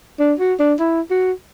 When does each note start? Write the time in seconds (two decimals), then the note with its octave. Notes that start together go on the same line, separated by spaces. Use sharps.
0.19 D4
0.39 F#4
0.59 D4
0.79 E4
1.10 F#4